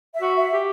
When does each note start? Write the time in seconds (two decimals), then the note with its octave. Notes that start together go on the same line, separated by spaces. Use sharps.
0.14 E5
0.21 F#4
0.37 E5
0.52 G4